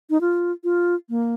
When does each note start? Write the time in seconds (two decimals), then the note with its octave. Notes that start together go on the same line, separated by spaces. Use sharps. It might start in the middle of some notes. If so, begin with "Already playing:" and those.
0.10 D#4
0.21 F4
0.64 F4
1.10 A#3